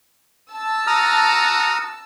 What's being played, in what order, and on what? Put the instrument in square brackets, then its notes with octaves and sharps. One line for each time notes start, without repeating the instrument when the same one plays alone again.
[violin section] A5 E6
[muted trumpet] F#4 [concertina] A#5 D#6 F6